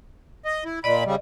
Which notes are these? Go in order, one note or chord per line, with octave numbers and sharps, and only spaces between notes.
D#5
E4
A#2 D5 D#5 B5
C#3 G3